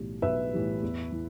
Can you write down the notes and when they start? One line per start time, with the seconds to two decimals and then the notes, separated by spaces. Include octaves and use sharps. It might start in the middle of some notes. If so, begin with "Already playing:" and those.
Already playing: B1 A2 E3 G3
0.22 B1 B4 E5
0.52 A2 E3 G3
0.82 E2
1.12 E3